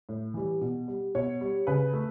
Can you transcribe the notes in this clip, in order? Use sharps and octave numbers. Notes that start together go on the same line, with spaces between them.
A2
E3 G3
B2
G3
B2 C#5
G3
C#3 B4
A3